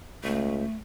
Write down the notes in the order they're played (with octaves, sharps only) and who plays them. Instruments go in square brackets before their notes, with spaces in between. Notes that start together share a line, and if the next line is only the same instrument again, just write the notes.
[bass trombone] C#2 [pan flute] A3